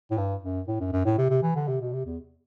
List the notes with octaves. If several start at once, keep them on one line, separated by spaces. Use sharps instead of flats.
A2
G2
F#2
A2
F#2
F#2
A2
C3
C3
E3
D3
C3
B2
C3
E2